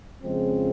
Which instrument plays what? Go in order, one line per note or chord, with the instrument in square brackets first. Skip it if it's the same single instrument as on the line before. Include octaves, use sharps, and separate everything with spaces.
[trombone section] F2 C#3 F3 G#3 C4